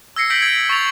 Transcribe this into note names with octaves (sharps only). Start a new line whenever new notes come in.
E6 G#6 A#6 C7 C#7
E6 G6 A#6 B6 D7 F#7
G#6 C7
C#6 A6 F7